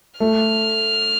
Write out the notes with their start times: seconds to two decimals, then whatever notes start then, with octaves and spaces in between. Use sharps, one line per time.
0.20 A3 F6